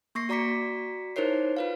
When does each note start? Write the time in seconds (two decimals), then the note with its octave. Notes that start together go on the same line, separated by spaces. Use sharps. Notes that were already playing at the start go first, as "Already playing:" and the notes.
0.15 A#3 C#6 A#6 C7
0.29 F#4 D5 A#5 D6 B6 C#7
1.16 D#4 E4 A#4 C5 C#5 C7
1.57 F4 B4 F5